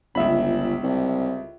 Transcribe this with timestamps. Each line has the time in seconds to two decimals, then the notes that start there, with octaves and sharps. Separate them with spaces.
0.15 G1 C#2 E5 B5
0.83 C2